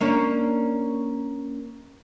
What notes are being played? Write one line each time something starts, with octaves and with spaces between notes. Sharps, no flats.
A#3 C#4 D4